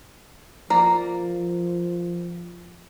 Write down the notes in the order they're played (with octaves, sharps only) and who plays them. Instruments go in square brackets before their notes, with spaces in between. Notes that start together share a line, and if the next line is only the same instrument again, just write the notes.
[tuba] F3 [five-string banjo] A#3 D5 A#5